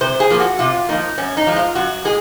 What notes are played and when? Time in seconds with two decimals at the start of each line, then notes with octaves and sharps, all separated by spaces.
0.01 C3 C5
0.20 G#4
0.30 F3 A#3
0.40 F#4
0.59 C3 F4
0.89 F3 A#3 D#4
1.18 F#2 C#4
1.37 D#4
1.47 F3 G#3
1.56 F4
1.75 F#2 F#4
2.05 G#3 G#4